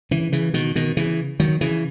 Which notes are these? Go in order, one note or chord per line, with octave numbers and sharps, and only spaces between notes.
C#3 E3
C#3 E3
B2 D#3
B2 D#3
C#3 E3
D#3 F#3
C#3 E3